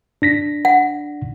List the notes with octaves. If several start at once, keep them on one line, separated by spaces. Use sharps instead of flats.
D4 A#6 B6
F#5